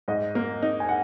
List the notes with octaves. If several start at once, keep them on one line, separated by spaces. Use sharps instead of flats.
G#2 D#5
A#3
D#4
G#5
F#5